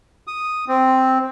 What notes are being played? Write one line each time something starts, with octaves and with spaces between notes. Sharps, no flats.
D#6
C4